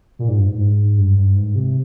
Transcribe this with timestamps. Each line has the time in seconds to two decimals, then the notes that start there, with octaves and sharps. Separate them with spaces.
0.19 A#2
0.28 G#2
0.37 G2
0.46 G#2
0.58 G#2
0.97 G2
1.17 G2
1.36 G#2
1.56 C3